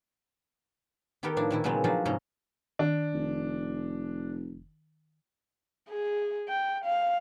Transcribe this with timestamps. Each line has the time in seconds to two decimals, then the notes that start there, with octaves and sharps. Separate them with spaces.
1.23 D#3 B3 D#4 G4 A4 A#4
1.36 A2 F3 D4 E4
1.51 A#2 D#3 E4
1.64 A#2 C#3 F#3 G#3 B3 C4
1.84 F3 F#3 C4 D4 D#4 F4
2.05 G#2 C3 C#4 D#5 A#5
2.79 D#3 D4
3.13 F1
5.89 G#4
6.49 G5
6.85 F5